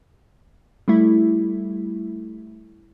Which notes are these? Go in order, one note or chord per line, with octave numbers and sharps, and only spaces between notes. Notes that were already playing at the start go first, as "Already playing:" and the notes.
G3 A3 E4